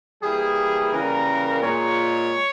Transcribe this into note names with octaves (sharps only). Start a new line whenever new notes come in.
E3 G3 A#3 G#4
C#3 E3 G3 A#3 A#4
A#2 G#3 C#5